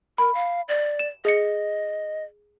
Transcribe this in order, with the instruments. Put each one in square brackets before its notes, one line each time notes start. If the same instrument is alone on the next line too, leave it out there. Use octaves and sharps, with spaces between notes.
[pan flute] A#4 [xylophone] B5
[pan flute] F5
D5
[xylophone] E7
[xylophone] G#4 C#7 [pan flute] D#5